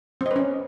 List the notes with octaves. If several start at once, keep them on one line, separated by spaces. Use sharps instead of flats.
C4 C#4 B4 D#5